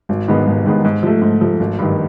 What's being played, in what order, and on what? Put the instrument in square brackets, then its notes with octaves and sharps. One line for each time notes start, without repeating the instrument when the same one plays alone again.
[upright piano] G#1
G#2 D#3 G#3 B3
G#1
G#2 D#3 G#3 B3
G#2
F3 A3
G#2
F3 A3
G#1
G2 D#3